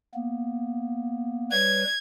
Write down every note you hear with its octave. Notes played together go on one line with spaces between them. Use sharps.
A#3 B3
G3 B4 C#5 G#6